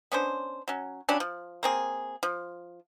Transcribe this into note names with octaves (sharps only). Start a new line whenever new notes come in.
B3 C#4 D4 C5
F#3 C#4
F#3 G3 C#4 D4
F3
A#3 C4 G#4
F3